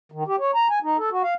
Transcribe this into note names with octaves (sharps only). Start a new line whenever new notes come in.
D#3
G4
C#5
A#5
G#5
D#4
A4
F#4
F5